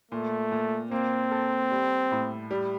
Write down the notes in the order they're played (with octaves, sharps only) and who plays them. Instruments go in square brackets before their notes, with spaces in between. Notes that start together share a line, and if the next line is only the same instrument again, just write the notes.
[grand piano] A#2 [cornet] A3
[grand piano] A#2
[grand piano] A#3 [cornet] C4
[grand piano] A4
G3
A2
G3